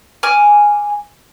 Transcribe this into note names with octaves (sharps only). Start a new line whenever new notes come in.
G#5 D6 F6